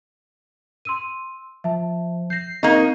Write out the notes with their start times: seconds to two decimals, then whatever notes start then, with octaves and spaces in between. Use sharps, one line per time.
0.85 C6 E6 D#7
1.64 F3 E5 A5
2.30 G6 A#6 C7
2.63 A#3 C4 D#4 C#6